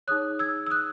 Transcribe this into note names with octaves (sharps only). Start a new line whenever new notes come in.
D#4 G#4 C#5 D#6 F#6
E6 G#6
E6
D#6 F#6